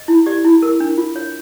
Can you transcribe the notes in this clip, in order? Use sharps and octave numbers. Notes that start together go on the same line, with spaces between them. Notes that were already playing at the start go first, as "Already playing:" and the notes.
Already playing: D#5
E4
G4 D5
E4
A#4
D4
F4
C#5